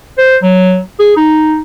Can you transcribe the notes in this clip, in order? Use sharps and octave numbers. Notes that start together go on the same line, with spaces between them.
C5
F#3
G#4
D#4